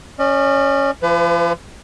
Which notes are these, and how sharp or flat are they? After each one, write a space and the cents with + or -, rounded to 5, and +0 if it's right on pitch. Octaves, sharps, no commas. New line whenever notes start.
C#4 +0 D5 +45
F3 -35 B4 +30